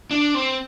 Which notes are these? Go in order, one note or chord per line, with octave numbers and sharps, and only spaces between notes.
D4
C4